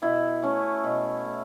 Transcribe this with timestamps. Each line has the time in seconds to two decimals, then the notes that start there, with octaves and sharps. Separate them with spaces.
0.02 B2 E4
0.42 A3 C#4
0.84 B2
1.25 A3